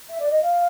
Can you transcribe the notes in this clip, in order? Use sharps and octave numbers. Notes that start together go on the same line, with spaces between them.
E5
D5
D#5
F5